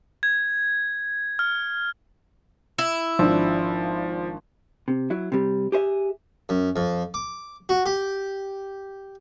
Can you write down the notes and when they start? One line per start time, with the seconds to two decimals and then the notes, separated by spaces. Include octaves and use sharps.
0.23 G#6
1.39 F6
2.78 E4
3.19 G#1 F3 D4
4.88 C3
5.10 F#3 E4
5.32 C3 G3
5.72 G4 G#4 C5 E5
6.49 F#2
6.76 F2
7.14 D6
7.69 F#4
7.86 G4